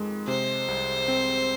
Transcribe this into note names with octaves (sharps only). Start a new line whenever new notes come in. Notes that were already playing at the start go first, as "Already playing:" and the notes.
Already playing: F2 D#3 G#3
C3 C5
C2
C4